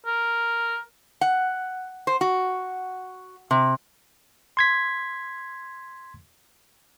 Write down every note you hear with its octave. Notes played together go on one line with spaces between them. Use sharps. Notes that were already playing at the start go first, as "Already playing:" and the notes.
A#4
F#5
C5
F#4
C3
C6 G#6 B6